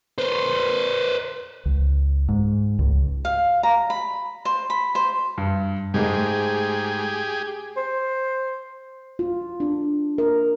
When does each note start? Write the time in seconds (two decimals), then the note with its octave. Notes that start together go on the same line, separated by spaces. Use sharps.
0.18 B4 C5
1.66 C#2
2.29 G#2
2.79 C#2
3.25 F5
3.63 A#5
3.90 B5
4.45 C5
4.70 B5
4.95 C5
5.38 G2
5.94 G#2 G#3 A3 G4 G#4
7.77 C5
9.19 F4
9.60 D4
10.18 A#4